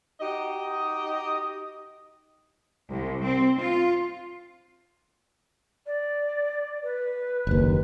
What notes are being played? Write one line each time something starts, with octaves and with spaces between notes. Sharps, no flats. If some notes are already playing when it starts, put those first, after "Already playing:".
D#4 F#4 G4 D#5
C2
C4
F4
D5
B4
F#1 D#2